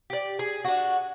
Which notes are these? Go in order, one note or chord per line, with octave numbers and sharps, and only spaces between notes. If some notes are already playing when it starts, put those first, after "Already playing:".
G4 D5
G#4
D4 F#4